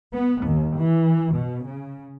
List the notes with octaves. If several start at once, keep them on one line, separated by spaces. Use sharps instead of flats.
B3
D#2
E3
B2
C#3